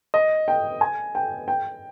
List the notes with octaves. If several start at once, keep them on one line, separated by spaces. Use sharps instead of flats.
D#5
G5
G#5
G5
G5